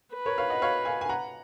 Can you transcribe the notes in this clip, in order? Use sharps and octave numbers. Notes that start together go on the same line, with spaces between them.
B4
A#4 C#5
C#5 F5
D#5 F#5
C#5 F5
F5 G#5
G#5
F#5 A#5